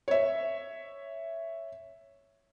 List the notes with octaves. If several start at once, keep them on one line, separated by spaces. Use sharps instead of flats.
C#5 E5